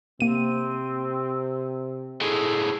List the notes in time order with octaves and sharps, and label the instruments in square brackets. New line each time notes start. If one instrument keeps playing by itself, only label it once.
[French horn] C3 [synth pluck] A#3 D#7 [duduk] C4
[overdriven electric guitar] A2 G#3 [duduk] A4